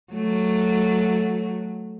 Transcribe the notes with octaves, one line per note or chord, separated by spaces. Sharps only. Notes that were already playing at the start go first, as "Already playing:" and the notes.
F#3 A3